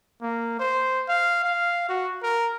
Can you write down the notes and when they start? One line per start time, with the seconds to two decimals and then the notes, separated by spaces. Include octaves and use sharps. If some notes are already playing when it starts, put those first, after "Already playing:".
0.22 A#3
0.60 C5
1.09 F5
1.44 F5
1.89 F#4
2.23 A#4